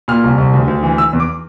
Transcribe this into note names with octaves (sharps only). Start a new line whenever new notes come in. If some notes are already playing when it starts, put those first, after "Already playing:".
A#2 F6
C2
C2
D2
D2
E3
E3 E6
E2
D6